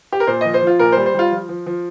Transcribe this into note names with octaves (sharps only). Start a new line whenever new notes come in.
G4
A#4
A#2 C5
F3 D#5
C5
F3
F4
A#2 A#4
G3 C5
C5
G3 F4
F3
F3
F3